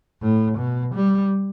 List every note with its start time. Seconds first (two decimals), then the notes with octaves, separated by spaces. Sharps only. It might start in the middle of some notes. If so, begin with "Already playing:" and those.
0.22 A2
0.58 B2
0.95 G3